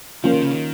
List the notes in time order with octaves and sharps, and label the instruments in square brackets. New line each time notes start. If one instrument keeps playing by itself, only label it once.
[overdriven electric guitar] F3 [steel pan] A#3 C#4 F4
[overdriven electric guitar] D#3
C#3
D#3